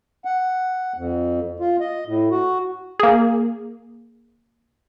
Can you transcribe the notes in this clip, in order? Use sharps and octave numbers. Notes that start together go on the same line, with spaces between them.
F#5
F2
F4
D#5
A2
F#4
A#3 G#4